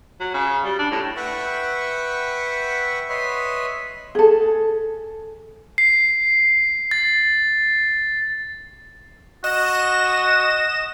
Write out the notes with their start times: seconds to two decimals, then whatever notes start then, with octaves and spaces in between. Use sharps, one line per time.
0.20 F#3
0.34 C#3
0.64 G3
0.79 D4
0.91 A2
1.17 B4 E5 F#5 G5 B5 C#6
3.09 B4 C#5 D#5 E5 B5 C6
4.15 G#4 A4
5.78 C7
6.91 A6
9.44 F#4 D#5 A#6 E7